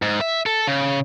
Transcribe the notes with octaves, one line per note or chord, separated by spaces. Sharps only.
G#2
E5
A4
C#3